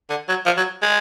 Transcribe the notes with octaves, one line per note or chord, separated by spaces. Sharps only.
D3
F#3
F3
F#3
G#3